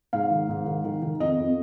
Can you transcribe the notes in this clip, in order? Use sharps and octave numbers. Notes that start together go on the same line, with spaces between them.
G#2 F5
D#3
G#2
D#3
D#3
D#3
F2 D#5
F2